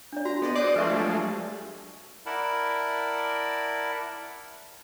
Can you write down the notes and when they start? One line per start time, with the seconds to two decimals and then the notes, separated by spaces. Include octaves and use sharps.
0.13 D4 D5
0.25 F#4 A#5
0.42 B3 G#4 D5 D#5
0.56 C5 D5 D#5 D#6 F#6 G6
0.76 F3 G#3 A3 D4 B4 E5 C#6
0.92 F#3 G3
2.26 E4 A#4 D5 F#5 A5 B5